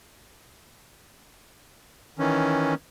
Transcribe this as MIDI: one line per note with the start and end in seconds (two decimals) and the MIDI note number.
2.19 2.74 51
2.19 2.74 52
2.19 2.74 61